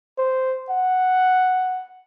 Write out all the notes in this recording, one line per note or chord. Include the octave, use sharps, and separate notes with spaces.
C5
F#5